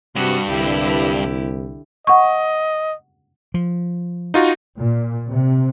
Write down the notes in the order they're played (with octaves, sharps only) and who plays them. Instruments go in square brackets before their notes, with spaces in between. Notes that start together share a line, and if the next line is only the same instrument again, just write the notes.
[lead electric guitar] G2 [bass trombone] C3 [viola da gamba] F#4
[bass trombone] C2 [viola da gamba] D3 E4 G4
[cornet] D#5 [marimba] F#5 C#6
[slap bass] F3
[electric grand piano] D#4 F4 F#4
[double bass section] A#2
C3